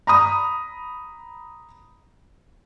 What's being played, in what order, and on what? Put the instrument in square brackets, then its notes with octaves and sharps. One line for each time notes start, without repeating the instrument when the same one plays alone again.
[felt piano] A#5 B5 D#6